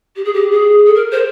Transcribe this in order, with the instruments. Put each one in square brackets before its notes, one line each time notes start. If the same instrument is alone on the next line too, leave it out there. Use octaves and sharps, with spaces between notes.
[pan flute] G4
G#4
G4
G#4
A4
A#4
C5